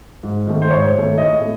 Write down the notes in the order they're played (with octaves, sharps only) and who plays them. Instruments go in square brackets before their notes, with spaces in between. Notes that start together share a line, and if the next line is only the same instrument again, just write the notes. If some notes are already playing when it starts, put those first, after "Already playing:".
[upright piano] G#2
D#3 A3
C5
G#2 C#5
D#3 A3
A2 D#5
A3